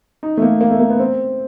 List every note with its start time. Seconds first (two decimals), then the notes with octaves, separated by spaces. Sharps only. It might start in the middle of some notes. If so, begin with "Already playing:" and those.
0.23 D#4
0.37 A3
0.42 A#3
0.61 A#3
0.71 A3
0.80 A#3
0.90 B3
0.99 C4